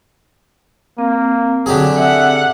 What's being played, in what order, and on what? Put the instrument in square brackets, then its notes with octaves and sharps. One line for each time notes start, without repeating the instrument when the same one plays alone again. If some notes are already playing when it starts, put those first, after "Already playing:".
[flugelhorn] A#3 [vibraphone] C4
[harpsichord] D3 G4 G#4 [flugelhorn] F#3
[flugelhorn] E5 [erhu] F#5